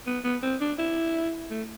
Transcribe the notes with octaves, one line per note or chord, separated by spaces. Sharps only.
B3
B3
C4
D4
E4
A3